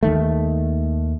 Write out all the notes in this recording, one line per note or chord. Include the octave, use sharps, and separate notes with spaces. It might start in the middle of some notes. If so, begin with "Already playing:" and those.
D#2 D#3 A3